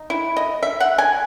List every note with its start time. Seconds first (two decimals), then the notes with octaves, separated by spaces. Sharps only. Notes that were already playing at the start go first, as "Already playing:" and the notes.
Already playing: D#4
0.10 E4
0.37 D#5
0.63 E5
0.80 F#5
0.98 G#5